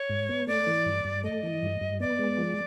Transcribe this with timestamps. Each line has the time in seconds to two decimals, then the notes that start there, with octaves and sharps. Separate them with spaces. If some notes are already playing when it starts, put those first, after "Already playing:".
Already playing: C#5
0.09 G#2
0.29 B3
0.47 A3 D5
0.67 E3
0.86 G2
1.05 G2
1.24 A3 D#5
1.43 E3
1.63 G2
1.81 G2
2.00 B3 D5
2.19 G#3
2.38 F3